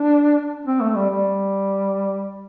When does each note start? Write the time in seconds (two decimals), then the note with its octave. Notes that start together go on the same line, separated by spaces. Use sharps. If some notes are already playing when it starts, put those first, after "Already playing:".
Already playing: D4
0.66 C4
0.81 A3
0.95 G3
1.10 G3